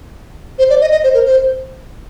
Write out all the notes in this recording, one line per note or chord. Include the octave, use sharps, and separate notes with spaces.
C5
D5
D#5
D#5
C5
A#4
C5